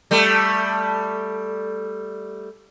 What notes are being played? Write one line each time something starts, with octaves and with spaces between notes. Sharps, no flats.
G3 A3